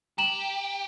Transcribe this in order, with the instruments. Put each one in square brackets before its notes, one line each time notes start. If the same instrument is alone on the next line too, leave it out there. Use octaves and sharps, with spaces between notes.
[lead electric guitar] G4 [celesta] A#5 E7 F#7